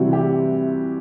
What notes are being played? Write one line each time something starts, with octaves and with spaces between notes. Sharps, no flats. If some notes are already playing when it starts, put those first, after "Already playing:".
Already playing: C3 E3 G3 F#4
G4